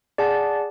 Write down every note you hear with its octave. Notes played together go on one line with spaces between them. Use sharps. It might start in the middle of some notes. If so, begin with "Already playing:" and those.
G#4 D5 F#5 A5